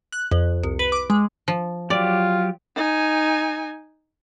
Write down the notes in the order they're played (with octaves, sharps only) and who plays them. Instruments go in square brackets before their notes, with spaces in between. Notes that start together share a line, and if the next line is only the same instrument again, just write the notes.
[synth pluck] F#6
F2
C2
B4
D6
G#3
[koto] F3
[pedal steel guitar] F#3 G4 [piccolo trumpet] F4 [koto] D5
[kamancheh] D#4 G#5